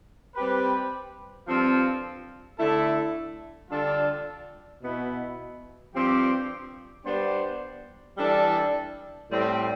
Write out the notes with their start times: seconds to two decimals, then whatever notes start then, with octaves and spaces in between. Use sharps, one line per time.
0.35 G3 C4 G4 B4
1.46 G2 F3 C4 F4 A4
2.59 D3 A3 E4 A4
3.70 D3 G3 D4 F4 A4
4.82 B2 B3 E4
5.94 G2 F3 C4 G4
7.05 G3 B3 D4 G4 C5
8.18 E3 G3 D4 A4
9.29 A2 G3 C4